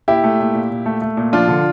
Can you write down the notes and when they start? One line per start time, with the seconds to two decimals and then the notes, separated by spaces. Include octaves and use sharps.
0.08 A#2 E4 G4
0.24 A3
0.39 A#2
0.54 A#2
0.70 A#2
0.86 A3
1.01 A3
1.17 A#2
1.33 F3 D4 F4
1.48 D3